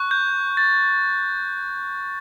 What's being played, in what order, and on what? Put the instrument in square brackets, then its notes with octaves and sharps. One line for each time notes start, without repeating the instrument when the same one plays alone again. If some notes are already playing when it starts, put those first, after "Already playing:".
Already playing: [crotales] C#6 F#6
G6
A6